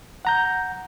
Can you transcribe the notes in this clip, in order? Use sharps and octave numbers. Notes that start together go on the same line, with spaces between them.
F#5 A#5 G6